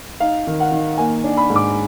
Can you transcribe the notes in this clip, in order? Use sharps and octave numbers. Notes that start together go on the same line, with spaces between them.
D#4 F5
D#3
F#5
D#3
A#3 G#5
D4
B5
G#2
D6